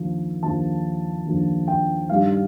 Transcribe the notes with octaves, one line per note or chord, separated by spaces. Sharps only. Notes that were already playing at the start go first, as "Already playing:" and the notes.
Already playing: D#2 D3 F3
D#2 D3 F3 A5
D#2 D3 F3
G5
G2 D#3 G3 F5